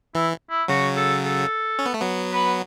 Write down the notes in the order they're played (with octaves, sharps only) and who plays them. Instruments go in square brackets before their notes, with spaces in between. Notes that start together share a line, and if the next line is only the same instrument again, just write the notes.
[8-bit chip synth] E3 [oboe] E4
[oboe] E4
[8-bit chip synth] C#3 F#3 [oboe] F#4
[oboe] A4
A4
[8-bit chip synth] C#4
B3
A3
F#3 B3
[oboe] B4